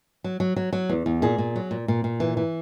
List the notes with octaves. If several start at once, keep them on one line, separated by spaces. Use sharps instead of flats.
F#3
F#3
F#3
F#3
E2
E2
A#2 G#4
A#2
F#3
A#2
A#2
A#2
E3
E3